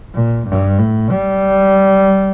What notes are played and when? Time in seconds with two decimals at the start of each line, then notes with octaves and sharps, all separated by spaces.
0.14 A#2
0.47 G2
0.79 A2
1.11 G3